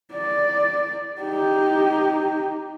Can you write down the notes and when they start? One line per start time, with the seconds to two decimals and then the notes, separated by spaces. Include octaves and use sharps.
0.13 D5
1.21 D#4 G4